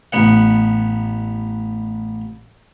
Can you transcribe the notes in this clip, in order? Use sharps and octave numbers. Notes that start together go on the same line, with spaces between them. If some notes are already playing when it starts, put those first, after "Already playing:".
A1 B3 F#5